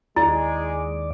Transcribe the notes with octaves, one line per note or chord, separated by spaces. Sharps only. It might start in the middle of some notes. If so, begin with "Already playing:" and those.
D#2 G#3 E4 D5